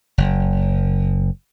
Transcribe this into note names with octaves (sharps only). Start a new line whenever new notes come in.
F#1